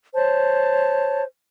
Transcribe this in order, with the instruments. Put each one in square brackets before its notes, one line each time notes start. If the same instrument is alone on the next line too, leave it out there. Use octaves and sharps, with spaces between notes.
[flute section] C5 C#5 A5